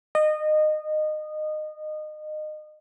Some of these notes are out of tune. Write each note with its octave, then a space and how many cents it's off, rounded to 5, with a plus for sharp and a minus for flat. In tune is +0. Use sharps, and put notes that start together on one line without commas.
D#5 -25